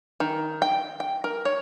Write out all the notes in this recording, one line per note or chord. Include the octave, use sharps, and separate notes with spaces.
D#3
G5
G5
A#4
C#5